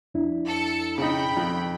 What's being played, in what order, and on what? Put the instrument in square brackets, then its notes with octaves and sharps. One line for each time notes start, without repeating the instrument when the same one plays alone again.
[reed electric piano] F2 D4 E4
[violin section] A4 C#7
[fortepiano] C#3 D#4 [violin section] G5 B5
[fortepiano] F2